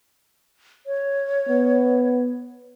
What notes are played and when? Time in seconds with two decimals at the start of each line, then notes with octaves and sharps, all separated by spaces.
0.87 C#5
1.48 B3